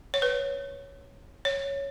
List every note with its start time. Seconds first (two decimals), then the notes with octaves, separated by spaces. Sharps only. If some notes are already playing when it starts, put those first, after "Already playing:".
0.14 C#5
0.22 B4
1.45 C#5